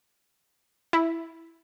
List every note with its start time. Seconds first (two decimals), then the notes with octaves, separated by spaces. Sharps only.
0.93 E4